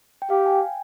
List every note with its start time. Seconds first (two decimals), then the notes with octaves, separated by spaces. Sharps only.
0.22 G5
0.30 G4 F5
0.46 G#5
0.61 G5